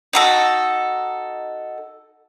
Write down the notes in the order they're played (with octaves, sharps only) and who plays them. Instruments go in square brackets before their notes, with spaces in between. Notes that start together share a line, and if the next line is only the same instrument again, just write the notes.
[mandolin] D#4 F#4 A4